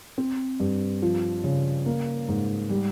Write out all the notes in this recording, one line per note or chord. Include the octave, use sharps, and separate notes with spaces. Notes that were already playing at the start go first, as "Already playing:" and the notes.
C4
G2
F3
C#3
A#3
G#2
G3